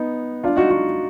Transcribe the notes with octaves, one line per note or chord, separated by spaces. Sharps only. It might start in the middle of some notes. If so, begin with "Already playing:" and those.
Already playing: B3 D#4
D4 F4
D#4 F#4
D#4 F#4